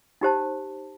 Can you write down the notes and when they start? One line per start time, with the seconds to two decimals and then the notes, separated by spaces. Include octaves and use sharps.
0.21 D#4 G4 C5 A5